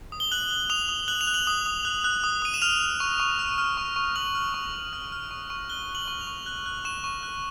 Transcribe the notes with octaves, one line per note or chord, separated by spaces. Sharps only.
D#6
G7
F#6 F#7
F#6
D#6 F7
D#6
F#6 F#7
F7
F#6
F#7
D#6
D#6
F#6
F#6
D#6
D#6 D#7
E7
F6 F7
F6
C#6
C#6
F6
F6
C#6
C#6
F6 F#7
F6
C#6
C#6
F6
F6
C#6
C#6
F#6 G7
F#6
F#7
C#6
F7
C#6
F#6
F#6
C#6 E7
C#6
F#6